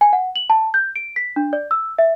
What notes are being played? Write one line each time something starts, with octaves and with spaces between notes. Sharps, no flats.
G#5
F#5
F#7
A5
G6
D7
B6
D4
D5
E6
E5